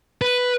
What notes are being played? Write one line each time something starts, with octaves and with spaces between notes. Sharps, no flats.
B4